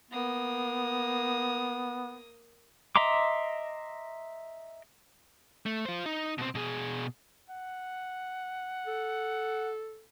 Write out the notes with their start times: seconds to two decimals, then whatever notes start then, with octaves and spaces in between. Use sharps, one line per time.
0.11 A#3 B3 D#6
2.96 D#5 E5 A#5 C6 D6
5.66 A3
5.85 F4 C5
6.06 D#4
6.38 B2 C4
6.55 B2 G#4
7.50 F#5
8.87 A4